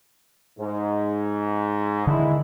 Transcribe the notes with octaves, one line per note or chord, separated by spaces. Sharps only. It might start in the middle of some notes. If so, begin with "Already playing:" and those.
G#2
D3 D#3 G#3 E4